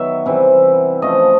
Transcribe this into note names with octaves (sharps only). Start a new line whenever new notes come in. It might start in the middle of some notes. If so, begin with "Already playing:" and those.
Already playing: D#3 F#3 B3 E5
C3 E3 G3
C#3 F3 A3 D#5